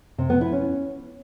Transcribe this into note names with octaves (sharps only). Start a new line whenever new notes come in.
C3
B3
E4
C#4